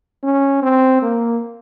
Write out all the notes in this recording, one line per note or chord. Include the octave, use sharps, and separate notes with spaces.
C#4
C4
A#3